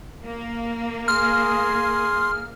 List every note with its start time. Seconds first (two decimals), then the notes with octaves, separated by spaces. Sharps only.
0.24 A#3
1.08 G#4 C6 F6